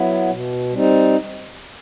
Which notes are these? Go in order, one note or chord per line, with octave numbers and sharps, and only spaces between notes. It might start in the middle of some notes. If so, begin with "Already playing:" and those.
Already playing: F#3 B3 E4
B2
G3 C4 D#4